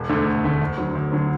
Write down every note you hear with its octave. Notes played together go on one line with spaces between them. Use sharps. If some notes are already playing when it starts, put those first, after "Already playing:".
Already playing: E1
D2 D3 A3
E1
D2 D3 A3
D2
D3 F#3
D2
D3 F#3